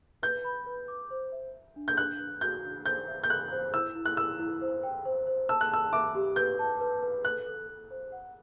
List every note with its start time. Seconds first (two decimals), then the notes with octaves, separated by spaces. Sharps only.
0.23 B4 G6
0.44 B5
0.66 B4
0.88 D6
1.11 C5
1.32 E5
1.54 E5
1.76 D4
1.88 G6
1.97 D4 F#6
2.20 B4
2.41 F#4 G6
2.64 D4
2.85 C5 G6
3.08 E5
3.24 G6
3.29 B5 F#6
3.52 C5
3.74 E4 E6
3.95 E4
4.06 F#6
4.17 E4 E6
4.39 E4
4.61 C5
4.83 G5
5.05 C5
5.27 C5
5.49 A5 E6
5.61 F#6
5.71 A5 E6
5.93 E5 D6
6.15 G4
6.36 B4 G6
6.59 A5
6.81 B4
7.03 B4
7.25 A4 F#6
7.46 A4
7.68 A4
7.91 C5
8.12 F#5